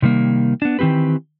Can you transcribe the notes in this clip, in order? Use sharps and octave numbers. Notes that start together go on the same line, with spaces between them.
C3 D#3 G3 A#3
B3 D4
D#3 E3 C4 G4 B4